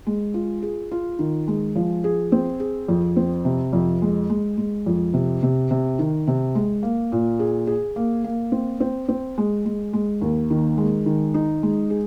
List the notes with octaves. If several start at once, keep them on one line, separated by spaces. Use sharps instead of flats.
G#3
F4
G#4
F4
D#3
G#3
F3
G#4
C4
G#4
F2
C4
C3
F2
G#3
G#3
G#3
F2
C3
C3
C3
D#3
C3
G#3
A#3
A#2
G#4
G#4
A#3
A#3
C4
C4
C4
G#3
G#3
G#3
D#2
D#3
G#3
D#3
D#4
G#3
G#4